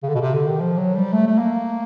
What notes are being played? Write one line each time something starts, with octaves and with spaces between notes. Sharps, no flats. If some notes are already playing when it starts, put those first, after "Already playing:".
C#3
D3
B2
C3
D3
D#3
F3
F#3
G3
A3
A3
A#3